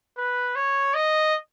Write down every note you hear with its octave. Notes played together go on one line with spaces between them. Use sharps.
B4
C#5
D#5